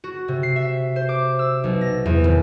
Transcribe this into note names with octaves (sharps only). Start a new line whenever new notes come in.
F#4
C3
C7
E5
C5
D6
E6
B1
A#6
E2
D#1